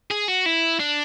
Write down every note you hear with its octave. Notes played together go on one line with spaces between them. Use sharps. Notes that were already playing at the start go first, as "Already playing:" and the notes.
G#4
F#4
E4
D4